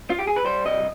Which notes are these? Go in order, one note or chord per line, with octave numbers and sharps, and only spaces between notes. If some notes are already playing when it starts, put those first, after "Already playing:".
F4
G4
G#4
B4
G3 C5
C2 D#5